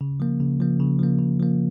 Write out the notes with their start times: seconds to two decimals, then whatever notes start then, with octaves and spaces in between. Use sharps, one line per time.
0.01 C#3
0.20 F3 A#3
0.41 C#3
0.60 F3 A#3
0.80 C#3
0.99 F3 A#3
1.19 C#3
1.39 F3 A#3